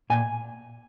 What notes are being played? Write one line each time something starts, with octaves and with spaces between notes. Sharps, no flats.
A#2 G#5